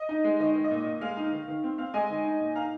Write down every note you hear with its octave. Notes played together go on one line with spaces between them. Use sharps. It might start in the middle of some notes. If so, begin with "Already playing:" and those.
Already playing: D#5
D#4
G#3
D#3 D#5
D#3
D#5
A#2
A#2
G#3 F5
D#4
D#3
D#3
C4
C4 F5
G#3 D#5 G#5
D#3
D#4
A#2
D#4 F5 A#5